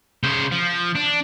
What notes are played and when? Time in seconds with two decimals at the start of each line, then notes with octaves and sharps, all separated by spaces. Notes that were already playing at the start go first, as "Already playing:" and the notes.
0.23 C#3 C5
0.52 F3
0.95 D4